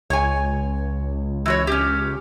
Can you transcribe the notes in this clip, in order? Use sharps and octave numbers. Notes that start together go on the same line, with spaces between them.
C#2 C#5 G#5
E3 F#4 C#5
C#4 G4